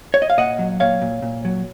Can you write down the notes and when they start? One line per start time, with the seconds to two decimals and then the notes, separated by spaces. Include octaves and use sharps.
0.14 C#5
0.22 D#5
0.30 F5
0.37 A#2 D#5 F#5
0.59 F#3
0.80 A#2 C#5 F5
1.02 A#2
1.22 A#2
1.45 F#3